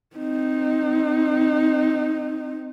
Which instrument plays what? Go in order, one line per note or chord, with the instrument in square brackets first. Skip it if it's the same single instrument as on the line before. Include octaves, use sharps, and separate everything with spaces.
[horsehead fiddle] C4 D#4